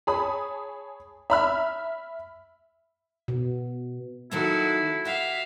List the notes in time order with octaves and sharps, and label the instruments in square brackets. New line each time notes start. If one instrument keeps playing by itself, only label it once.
[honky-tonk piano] G#4 C#5 A5 B5 D#6
E5 B5 F6
[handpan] B2
[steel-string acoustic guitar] D#3 F#3 A#3 [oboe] E4 [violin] F#4 A4
[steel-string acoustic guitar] F#4 G4 [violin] E5 F5